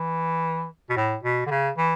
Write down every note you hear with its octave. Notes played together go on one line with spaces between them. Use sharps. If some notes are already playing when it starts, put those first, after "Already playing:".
Already playing: E3
B2
A2
B2
D3
C#3
E3